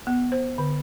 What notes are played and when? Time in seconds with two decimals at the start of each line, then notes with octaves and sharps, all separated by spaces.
0.07 B3
0.32 C5
0.58 D3